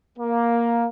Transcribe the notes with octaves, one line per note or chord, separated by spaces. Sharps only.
A#3